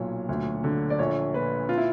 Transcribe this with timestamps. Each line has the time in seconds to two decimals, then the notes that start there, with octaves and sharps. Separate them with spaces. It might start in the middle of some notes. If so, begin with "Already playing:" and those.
Already playing: B1 A#2 C#5
0.29 D2
0.64 D3
0.90 D5
0.99 A#1 C#5
1.34 A#2 B4
1.69 F4
1.78 E4